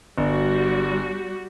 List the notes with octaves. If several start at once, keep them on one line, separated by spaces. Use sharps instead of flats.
G1 G3 F#4